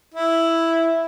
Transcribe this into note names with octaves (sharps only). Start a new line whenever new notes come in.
E4